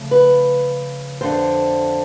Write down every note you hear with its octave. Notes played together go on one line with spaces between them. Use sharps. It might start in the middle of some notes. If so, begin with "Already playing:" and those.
Already playing: C#3 F3 A3
B4
F2 D3 F3 C5